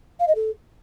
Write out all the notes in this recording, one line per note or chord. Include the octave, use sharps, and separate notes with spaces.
F5
D#5
A4